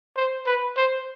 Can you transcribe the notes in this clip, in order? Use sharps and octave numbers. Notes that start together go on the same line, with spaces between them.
C5
B4
C5